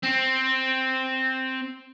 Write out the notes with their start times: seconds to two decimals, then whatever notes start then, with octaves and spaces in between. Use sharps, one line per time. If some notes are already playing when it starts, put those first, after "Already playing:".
0.03 C4